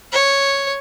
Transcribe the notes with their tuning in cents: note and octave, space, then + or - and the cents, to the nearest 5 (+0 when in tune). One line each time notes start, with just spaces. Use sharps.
C#5 -5